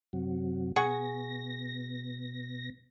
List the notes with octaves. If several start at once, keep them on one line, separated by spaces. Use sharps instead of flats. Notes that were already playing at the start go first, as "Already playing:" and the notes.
F#2 C3 F#3
B2 G#4 F#5 C#6 A#6